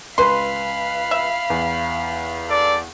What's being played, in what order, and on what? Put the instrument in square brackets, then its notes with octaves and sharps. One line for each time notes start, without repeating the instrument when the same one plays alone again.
[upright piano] C#2 B4 [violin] F5 B5 [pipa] C6
[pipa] E5
[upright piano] E2
[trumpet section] A4 D5